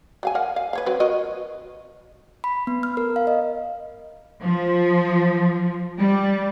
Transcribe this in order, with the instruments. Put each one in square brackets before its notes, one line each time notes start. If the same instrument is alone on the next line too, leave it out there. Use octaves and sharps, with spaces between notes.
[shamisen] F#3 F5 G#5
A#4 F5 F#5
F5
B4 C#5 F5
F#3 C4 B4
F#4 A#4 D#5
[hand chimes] B5
B3
F6
A#4
F5
D#5
[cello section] F3
G3